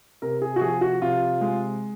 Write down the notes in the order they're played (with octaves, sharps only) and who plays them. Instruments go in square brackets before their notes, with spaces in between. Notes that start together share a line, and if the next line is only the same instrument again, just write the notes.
[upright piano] C3 A#4
G#4
F#4
F3 G#4
F#4
C3 F4
G#3